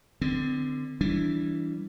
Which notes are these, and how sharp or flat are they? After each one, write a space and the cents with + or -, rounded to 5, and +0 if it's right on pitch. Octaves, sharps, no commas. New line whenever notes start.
D3 +15 C4 -30
E3 +0 G3 +0 D4 -20